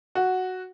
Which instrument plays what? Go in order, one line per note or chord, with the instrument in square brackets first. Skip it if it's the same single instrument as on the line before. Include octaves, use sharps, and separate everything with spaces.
[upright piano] F#4